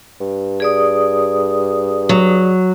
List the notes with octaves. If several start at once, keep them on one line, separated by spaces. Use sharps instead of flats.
G2
G#4 D5 D#6
F#3